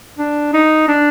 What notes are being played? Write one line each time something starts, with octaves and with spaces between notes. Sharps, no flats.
D4
D#4
D4